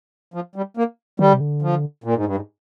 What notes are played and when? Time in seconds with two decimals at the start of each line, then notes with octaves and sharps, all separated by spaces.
0.34 F3
0.56 G3
0.77 A#3
1.19 D#3 G3
1.26 D3
1.33 C3
1.40 D3
1.62 F3
2.04 A#2
2.14 G#2
2.25 G2
2.36 G#2